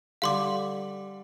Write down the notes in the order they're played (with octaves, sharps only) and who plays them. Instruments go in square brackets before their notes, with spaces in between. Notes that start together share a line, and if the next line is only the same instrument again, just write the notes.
[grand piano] D3 G3 [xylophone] F5 C6 D6